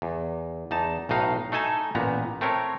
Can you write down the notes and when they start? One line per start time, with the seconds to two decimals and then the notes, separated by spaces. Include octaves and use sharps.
0.02 E2
0.71 E2 D#4 A5
1.09 B1 A2 D#4 F5
1.52 A3 D#4 A4 G#5 A5
1.95 A1 A#2 B3 A#5
2.41 A3 C4 A#4 C#5